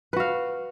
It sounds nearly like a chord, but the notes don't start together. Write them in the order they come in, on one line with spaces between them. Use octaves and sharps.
B4 F#4 F5